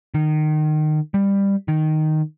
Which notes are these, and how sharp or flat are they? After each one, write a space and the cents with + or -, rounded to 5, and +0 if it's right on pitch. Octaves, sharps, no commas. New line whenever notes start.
D#3 -25
G3 +15
D#3 -5